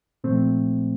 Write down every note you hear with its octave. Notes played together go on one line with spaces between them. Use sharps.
A#2 F3 A3 C4